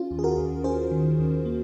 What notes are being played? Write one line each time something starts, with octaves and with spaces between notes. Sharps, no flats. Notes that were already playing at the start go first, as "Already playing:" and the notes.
Already playing: C#4 F4
D#2
G#4
F#4 A#4
D#2
C#4 G#4 C5
D#3
D#2
A#3